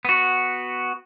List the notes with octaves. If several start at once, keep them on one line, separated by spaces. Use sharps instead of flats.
B3 F#4